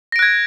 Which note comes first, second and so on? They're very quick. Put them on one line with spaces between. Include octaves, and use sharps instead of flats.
A#6 D7 F#6 G#6